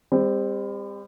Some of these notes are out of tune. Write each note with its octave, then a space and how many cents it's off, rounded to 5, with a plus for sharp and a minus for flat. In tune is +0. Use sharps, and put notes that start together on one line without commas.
G3 +40 C4 +0